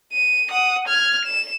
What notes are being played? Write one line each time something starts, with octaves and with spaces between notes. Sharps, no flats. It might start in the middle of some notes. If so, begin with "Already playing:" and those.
D#7
F#5 D#6
F6 G#6
E7